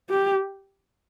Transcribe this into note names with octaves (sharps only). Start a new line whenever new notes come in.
G4